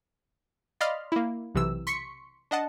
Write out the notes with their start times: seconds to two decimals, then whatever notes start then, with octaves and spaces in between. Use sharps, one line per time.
0.81 D5 D#5 F5 B5 C6 F6
1.12 A#3 E4
1.55 B1 C3 E3 E6
1.87 C6 C#6 B6 C#7
2.51 D4 D#5 F#5 A5